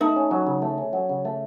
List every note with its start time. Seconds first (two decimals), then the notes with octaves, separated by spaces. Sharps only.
0.01 A3 D#4
0.16 C#4
0.31 F#3
0.47 C#3
0.62 A3
0.78 C#4
0.93 F#3
1.09 C#3
1.25 A3